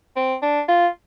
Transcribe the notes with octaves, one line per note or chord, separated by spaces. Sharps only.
C4
D4
F4